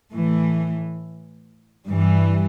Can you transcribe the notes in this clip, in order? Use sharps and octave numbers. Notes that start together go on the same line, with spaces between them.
A2 E3 A3
G2 E3 G3